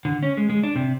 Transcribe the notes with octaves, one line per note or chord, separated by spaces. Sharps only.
D3
C#4
G#3
G#3
D4
C3